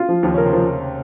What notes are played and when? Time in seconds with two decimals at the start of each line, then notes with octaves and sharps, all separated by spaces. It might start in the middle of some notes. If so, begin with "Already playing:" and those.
Already playing: F4
0.09 F3
0.23 D#2 D#3 F3
0.29 C4
0.34 C#3 C#4
0.38 A#4
0.45 C3 C4
0.53 F3